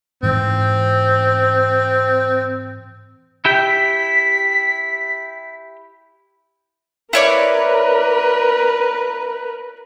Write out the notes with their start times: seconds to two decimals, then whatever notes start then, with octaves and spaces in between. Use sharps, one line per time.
0.23 G#2 E3 C4
3.45 E4 G4 G5 B6
7.13 E4 A#4 B4 C#5 D5